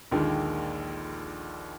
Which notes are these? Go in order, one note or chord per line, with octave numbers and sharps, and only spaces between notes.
A#1 D#2 D3 D#3 G#3